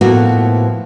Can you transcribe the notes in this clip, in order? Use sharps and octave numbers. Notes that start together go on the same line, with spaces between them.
A2 F3 A#3 B3 F#4